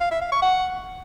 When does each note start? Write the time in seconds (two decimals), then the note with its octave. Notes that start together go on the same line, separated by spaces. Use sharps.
0.01 F5
0.11 E5
0.21 F5
0.32 C#6
0.42 F#5